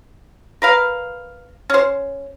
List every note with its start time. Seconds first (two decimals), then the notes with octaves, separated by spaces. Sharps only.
0.62 A#4 B4 F5
1.70 C#4 C5